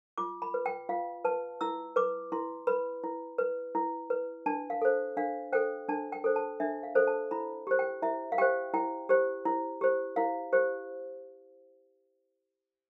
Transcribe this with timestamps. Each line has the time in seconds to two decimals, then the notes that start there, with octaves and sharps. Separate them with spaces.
0.18 F4 D6
0.42 B5
0.54 B4
0.66 G5
0.89 F4 F5
1.24 B4 A5
1.61 E4 E6
1.96 B4 D6
2.32 E4 C6
2.67 B4 B5
3.03 E4
3.38 B4
3.75 E4
4.10 B4
4.46 D4 A5
4.70 F5
4.82 A4 C5
5.17 D4 F5
5.53 A4 C5 G5
5.89 D4 A5
6.12 G5
6.24 A4 C5
6.36 A5
6.60 D4 E5
6.83 F5
6.95 A4 C5
7.07 A5
7.31 E4 B5
7.67 G4 C5
7.79 G5
8.02 E4 E5
8.32 F5
8.38 G4 C5 G5
8.74 E4 G5
9.09 G4 C5
9.45 E4
9.81 G4 C5
10.16 E4 F5
10.52 G4 C5